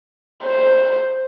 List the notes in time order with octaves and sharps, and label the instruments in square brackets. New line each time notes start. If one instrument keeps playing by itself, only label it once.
[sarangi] C5